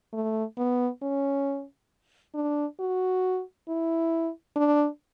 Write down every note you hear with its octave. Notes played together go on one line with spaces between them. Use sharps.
A3
B3
C#4
D4
F#4
E4
D4